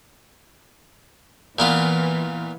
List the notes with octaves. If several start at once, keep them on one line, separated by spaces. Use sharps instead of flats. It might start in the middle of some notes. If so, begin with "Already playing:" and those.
A#2 E3 B3 F4